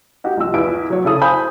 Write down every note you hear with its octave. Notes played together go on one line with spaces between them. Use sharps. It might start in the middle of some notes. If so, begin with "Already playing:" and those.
D#4 F#4 G4
C2 F3 D#5 E6
E2 E4 F4 D7
F#3 C#5
C#3 E4 A4 D#6
C5 F5 G#5 B5 G6